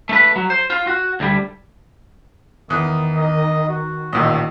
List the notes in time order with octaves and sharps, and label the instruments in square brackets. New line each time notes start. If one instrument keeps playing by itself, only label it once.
[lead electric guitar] A3 B4
F#3
C5
F4
F#4
D2 G3
[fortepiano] E2 [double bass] D#3 [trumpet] D#6
[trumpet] D#5
F#4
[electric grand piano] A1 A#2 D#3 [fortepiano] D#5